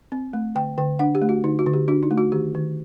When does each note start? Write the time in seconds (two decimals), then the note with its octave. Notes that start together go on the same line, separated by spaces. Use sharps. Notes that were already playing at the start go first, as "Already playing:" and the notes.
0.12 C4
0.33 A3
0.55 D3 G5
0.78 D3 G5
0.99 D4 F#5
1.15 G4
1.22 A3
1.29 F#4
1.44 D3 D#4
1.59 F#4
1.66 D3
1.73 G4
1.88 D4 F#4
2.03 D#4
2.11 A3
2.18 F#4
2.32 D#3 G4
2.55 D#3